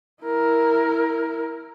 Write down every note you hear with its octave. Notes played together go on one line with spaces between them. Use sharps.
E4 A#4